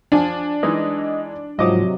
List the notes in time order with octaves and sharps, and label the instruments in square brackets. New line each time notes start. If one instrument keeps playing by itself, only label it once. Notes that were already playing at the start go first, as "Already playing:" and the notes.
[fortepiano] F3 G#5 [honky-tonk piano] D4
[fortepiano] E3 G#3 D#4 [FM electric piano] D#5
[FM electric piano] G#2 F3 [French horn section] C3 F#3 [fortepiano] D#5 D6 D#6